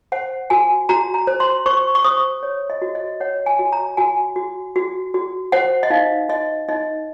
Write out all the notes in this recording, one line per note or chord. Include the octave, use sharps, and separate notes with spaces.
C5 F#5
F#4 G#5
F#4 A#5
A#5
C5
C6
C5 C#6
C#6
C5 D#6
C#5
D#5
F#4
D#5
C#5 F#5
G#5
F#4
A#5
F#4 G#5
F#4
F#4
F#4
C5 F#5
D#5
D#4 F5
D#4 D#5
D#4 D#5